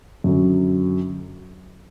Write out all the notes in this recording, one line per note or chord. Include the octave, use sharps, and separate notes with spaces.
F#2 D3 F#3